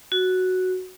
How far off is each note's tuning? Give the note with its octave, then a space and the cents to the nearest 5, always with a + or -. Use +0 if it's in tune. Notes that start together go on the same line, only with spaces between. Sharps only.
F#4 +0